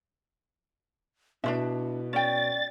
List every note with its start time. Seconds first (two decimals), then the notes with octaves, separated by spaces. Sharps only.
1.44 B2 D4 E4 F4 E5
2.13 C#4 D5 G5 A6